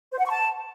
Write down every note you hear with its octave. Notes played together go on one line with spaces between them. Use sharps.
C5
F#5
C#6
A5